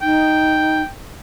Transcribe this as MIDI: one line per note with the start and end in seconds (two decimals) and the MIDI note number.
0.02 0.82 63
0.02 0.89 79